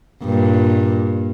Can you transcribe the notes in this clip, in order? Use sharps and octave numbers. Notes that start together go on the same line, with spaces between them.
G2 A#2